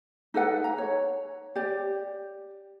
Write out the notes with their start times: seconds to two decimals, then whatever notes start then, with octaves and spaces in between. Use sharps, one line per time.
0.34 D#4 A4 B4 F#5
0.64 A#5
0.78 C#5
1.56 G4 D5